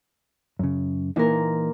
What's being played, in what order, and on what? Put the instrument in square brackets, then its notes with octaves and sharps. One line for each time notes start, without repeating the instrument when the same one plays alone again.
[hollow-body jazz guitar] F#2 C#3
[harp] A#2 A#4 [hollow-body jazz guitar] E3 D#4